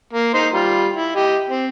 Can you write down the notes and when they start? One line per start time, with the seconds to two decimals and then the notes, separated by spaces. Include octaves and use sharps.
0.13 A#3
0.34 D#4 C5 C6
0.53 G3 F4
0.94 E4
1.16 G4 D#5
1.50 C4